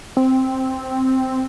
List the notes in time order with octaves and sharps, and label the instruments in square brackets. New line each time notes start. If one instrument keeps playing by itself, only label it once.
[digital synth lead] C4